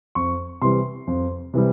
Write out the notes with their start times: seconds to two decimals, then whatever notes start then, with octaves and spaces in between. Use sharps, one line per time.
0.15 F2 C#6
0.61 C3 E3 G3 C6
1.07 F2
1.54 C3 E3 G3